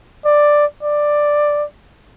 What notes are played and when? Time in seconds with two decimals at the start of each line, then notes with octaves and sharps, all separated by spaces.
0.25 D5
0.83 D5